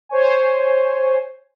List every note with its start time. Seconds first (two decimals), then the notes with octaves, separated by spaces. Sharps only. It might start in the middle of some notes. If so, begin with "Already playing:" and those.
0.09 C5 C#5 G#5